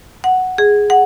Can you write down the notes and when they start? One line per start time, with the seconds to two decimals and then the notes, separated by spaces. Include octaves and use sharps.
0.24 F#5
0.58 G#4
0.90 F#5